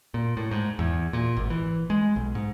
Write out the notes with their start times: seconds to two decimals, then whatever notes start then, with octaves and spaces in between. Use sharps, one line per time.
0.14 A#2
0.37 A2
0.51 G#2
0.79 E2
1.13 A#2
1.37 G#1
1.50 E3
1.90 G#3
2.16 B1
2.35 G#2